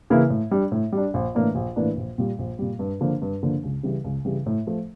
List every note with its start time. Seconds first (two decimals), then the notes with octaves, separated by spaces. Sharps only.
0.10 C#3 E3 A#3 E4
0.30 A2
0.51 G3 D4
0.72 A2
0.92 G3
0.97 D4
1.14 A#1
1.35 A2 E3 A#3 D4
1.55 A#1
1.76 A2 E3 A#3 D4
1.97 A#1
2.18 A#2 G3
2.39 A#1
2.59 A#2 G3
2.79 G2
3.01 D3 F3 A#3
3.22 G2
3.43 D3 F3 A#3
3.63 C#2
3.83 C#3 E3 G3
4.04 C#2
4.25 C#3 E3 G3
4.46 A2
4.67 F3 A3